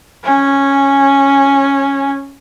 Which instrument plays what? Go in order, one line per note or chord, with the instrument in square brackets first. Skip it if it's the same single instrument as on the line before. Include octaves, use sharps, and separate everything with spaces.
[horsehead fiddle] C#4 G#5